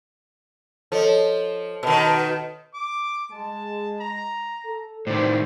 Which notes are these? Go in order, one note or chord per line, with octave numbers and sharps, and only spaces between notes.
F3 A4 C#5 D#5
B2 D#3
D6
G#3 A5
A#5
A4
A2 D#3 E3 C5 D5